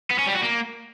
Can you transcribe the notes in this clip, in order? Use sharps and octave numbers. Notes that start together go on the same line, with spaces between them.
B3
C#4
G3
F#4
A#3